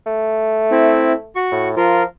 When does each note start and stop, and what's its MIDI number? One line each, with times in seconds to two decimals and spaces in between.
0.06 1.32 57
0.71 1.13 60
0.71 1.13 64
1.36 1.69 66
1.36 1.69 85
1.52 1.74 45
1.77 2.05 53
1.77 2.03 65
1.77 2.03 70